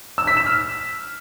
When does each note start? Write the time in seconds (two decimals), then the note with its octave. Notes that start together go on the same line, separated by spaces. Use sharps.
0.18 E6
0.27 B6
0.37 E7
0.46 F6